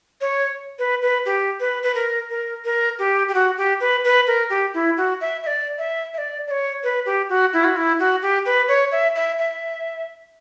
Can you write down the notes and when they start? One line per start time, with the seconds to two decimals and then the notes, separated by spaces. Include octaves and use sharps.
0.21 C#5
0.79 B4
1.02 B4
1.26 G4
1.60 B4
1.83 B4
1.95 A#4
2.30 A#4
2.65 A#4
2.99 G4
3.29 G4
3.34 F#4
3.57 G4
3.80 B4
4.05 B4
4.27 A#4
4.50 G4
4.74 E4
4.97 F#4
5.21 E5
5.43 E5
5.47 D5
5.78 E5
6.14 E5
6.18 D5
6.47 D5
6.51 C#5
6.83 B4
7.06 G4
7.29 F#4
7.53 E4
7.64 F#4
7.76 E4
8.00 F#4
8.22 G4
8.46 B4
8.68 C#5
8.92 E5
9.16 E5
9.39 E5